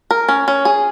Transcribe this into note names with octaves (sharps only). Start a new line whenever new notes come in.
A#4
C#4
C#4
G#4